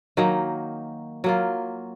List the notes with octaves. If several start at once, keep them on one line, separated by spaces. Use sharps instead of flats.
D#3 F#3 A#3 D#4
F#3 A#3 F4